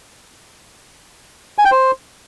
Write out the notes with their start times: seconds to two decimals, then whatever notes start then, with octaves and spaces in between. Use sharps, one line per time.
1.58 G#5
1.65 G5
1.72 C5